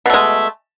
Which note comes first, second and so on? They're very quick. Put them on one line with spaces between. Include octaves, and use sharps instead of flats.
B2 A3 G#3